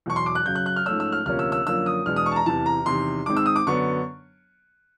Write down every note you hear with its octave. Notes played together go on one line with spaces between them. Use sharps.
E2 B2 F#3 C#6
C6
D6
F#6
F#2 C#3 F#3 G6
F#6
F#6
F6
G#2 F3 A3 C#4 E6
E6
F6
D2 C3 F3 A#3 C#4 F6
E6
E6
F#2 D3 F3 A#3 C#4 E6
D#6
E2 B2 G#3 B3 D4 F6
D#6
C#6
A5
A#5
E2 C3 E3 A5
A#5
E2 C3 D#3 C6
G#2 D#3 G#3 C4 D6
E6
D#6
D6
F#2 D3 F#3 B3 D4 C#6